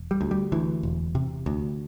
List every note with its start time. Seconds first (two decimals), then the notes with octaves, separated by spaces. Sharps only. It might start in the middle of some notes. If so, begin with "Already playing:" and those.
Already playing: E1
0.11 G3
0.21 D2
0.31 G3
0.52 D2 E3
0.83 E1
1.15 C3
1.46 D2